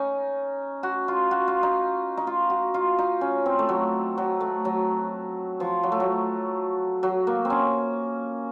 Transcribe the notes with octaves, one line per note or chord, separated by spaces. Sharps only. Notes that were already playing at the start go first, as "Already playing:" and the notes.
Already playing: C#4 D#4
F#4
F4
F#4
F4
D#4
D#4
F4
F#4
F4
D#4
C#4
C4
A3
F#3
F#3
A3
F#3
F3
F#3
A3
F#3
F#3
A#3
C4
C#4